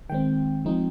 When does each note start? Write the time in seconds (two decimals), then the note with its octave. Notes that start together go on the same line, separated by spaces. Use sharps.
0.09 D#3 G#3 C4 G5
0.65 F3 G#3 C4 D#4